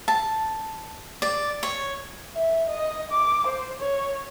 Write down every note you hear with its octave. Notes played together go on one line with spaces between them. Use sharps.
A5
D5
C#5
E5
D#5
D6
C5
C#5